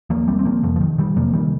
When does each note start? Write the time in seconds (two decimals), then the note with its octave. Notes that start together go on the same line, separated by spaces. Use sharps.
0.10 D#2 F3 A#3
0.28 G3 C4
0.39 C4
0.45 F3 A#3
0.63 F2 C3 F3
0.76 F3
0.81 D#3
0.98 D#3 G3
1.16 F2 C3 F3 A#3
1.33 D#3 G3